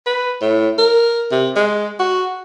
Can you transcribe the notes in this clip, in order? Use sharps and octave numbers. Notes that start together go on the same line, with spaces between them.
B4
A2
A#4
C3
G#3
F#4